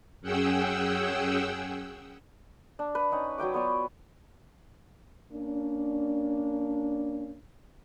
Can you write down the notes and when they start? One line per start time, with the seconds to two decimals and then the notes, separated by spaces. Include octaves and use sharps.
0.21 F#2 C#4 G#4 F#5 G5 E6
2.79 D4
2.95 B4
3.12 C#4 D#4 F#5
3.38 F#3 B4 G5 D6
3.54 B3 F4 C#5 D5
5.32 A#3 C#4 D4